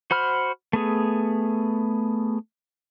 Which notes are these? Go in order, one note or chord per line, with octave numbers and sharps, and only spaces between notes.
F#4 C5 B5 F6
A3 B3 G#4